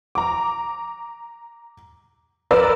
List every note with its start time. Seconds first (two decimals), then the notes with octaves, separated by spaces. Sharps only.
0.15 A#5 D6
2.51 A#4 B4 D5 E6